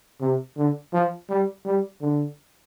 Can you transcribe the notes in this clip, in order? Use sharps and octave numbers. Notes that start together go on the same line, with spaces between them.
C3
D3
F3
G3
G3
D3